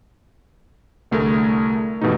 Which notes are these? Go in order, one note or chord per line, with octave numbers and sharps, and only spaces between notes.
C2 D3 A3 G#4 A#4
G2 B2 E3 A3 D#4